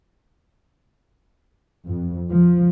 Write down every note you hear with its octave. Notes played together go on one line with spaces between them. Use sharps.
F2
F3